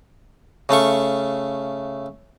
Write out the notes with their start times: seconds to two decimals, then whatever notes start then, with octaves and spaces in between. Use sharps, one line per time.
0.69 C#3 A3 F5 C#6